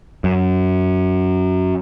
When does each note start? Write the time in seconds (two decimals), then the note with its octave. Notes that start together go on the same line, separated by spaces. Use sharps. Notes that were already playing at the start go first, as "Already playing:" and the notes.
0.24 F#2